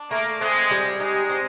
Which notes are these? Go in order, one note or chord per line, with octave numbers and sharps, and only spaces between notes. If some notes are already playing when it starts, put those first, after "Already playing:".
Already playing: D4
A3 A#3
G#3 C4
G3
G#3 D#4
C4